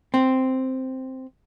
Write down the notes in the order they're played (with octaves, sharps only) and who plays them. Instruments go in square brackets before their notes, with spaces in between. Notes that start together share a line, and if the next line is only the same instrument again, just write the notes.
[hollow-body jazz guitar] C4